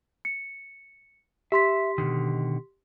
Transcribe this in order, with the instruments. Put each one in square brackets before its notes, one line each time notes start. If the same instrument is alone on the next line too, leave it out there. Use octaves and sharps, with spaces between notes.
[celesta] C#7
[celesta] G4 C6 B6 [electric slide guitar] E5
[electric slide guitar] B2 D3 D#3